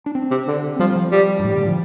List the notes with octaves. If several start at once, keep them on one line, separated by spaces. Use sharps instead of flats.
D4
C4
C3
D3
F3 G3
F3
G3
G2
A2 G3
D3
F3